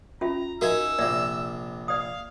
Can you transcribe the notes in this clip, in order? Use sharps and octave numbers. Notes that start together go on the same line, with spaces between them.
C#4 F4 E5 A#5
D#4 F#4 A#4 E5 F5 G#5 E6
A#1 C3 D5 E5
D5 F5 D#6